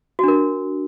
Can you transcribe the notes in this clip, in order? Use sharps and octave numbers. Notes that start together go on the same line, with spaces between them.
D4 F#4 A#4